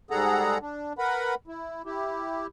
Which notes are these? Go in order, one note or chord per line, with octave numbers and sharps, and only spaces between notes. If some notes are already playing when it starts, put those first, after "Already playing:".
G#2 G3 G#4 A4 F#5 A#5
D4
A#4 B4 F#5 B5
E4
E4 G4